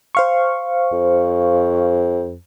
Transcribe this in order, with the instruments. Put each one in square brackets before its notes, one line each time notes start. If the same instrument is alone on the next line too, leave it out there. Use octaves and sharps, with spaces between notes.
[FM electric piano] C5 F5 C#6
[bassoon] F2